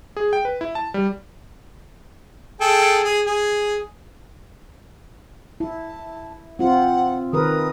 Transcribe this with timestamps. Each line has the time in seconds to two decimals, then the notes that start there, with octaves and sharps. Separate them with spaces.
0.17 G#4
0.33 G5
0.45 B4
0.61 E4
0.75 A5
0.94 G3
2.61 G#4 A4 G5
3.04 G#4
3.27 G#4
5.60 E4 A5
6.59 C4 F4 F#5
7.33 D#3 A#4 B4 D#6